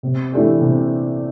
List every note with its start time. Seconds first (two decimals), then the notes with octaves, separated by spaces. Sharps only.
0.03 C3
0.32 E3 A3 D4 G4
0.60 C3